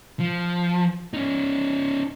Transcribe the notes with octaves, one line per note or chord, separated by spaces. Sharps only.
F3
C#4 D#4